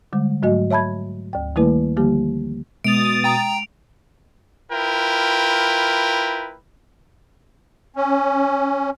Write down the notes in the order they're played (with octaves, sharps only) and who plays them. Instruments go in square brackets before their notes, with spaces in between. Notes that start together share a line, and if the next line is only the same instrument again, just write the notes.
[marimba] D3 G3 G#3
G#2 F#3 A3 F#4 D#5
C#5 E5 A5 B5 G#6
D2 G5
D#3 G3 A3 A#3 E4 B4
D3 F3 G3 A#3 G4
[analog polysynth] B2 D#6 A6 [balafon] G#3 [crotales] D7 F7
[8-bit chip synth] G5 A#5
[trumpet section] E4 F4 A#4 B4 G5
[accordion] C#4